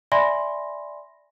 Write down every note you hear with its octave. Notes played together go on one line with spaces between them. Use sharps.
D5 E5 G#5 B5 C6 A#6